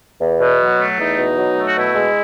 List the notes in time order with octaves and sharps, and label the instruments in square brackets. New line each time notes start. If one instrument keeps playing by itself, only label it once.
[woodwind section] E2
B2
F#3
A3
E2 D#4
B2
F#3
A3
F#4
B2 E4
G#3